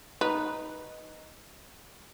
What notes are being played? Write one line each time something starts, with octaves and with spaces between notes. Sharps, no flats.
D#4 B4